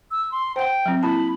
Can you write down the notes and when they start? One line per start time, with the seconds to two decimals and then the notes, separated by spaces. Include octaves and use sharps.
0.11 E6
0.32 C6
0.56 C5 F#5 G5
0.86 F#3 C4
1.03 A#3 E4 A5 B5